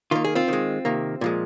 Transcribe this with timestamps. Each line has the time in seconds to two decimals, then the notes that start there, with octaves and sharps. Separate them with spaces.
0.11 D#3 A#3 F4
0.24 G#4
0.35 C4 F4
0.48 D#3 G#3
0.85 C3 D#3 A#3
1.21 A#2 F3 G#3